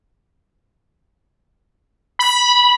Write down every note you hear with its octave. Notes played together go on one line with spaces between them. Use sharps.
B5